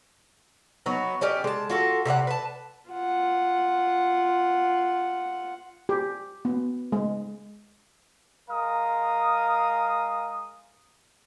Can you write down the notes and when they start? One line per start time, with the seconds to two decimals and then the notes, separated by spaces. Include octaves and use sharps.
0.86 F#3 B3 D#4
1.21 C#4 G4 D5 D#5
1.44 G#3 A5
1.70 F4 F#4 A4
2.05 C3 E4 D5 F#5
2.27 B4 A5
2.91 F4 F#5
5.89 G4
6.45 B3
6.92 G#3
8.51 G#3 A#4 F5 D#6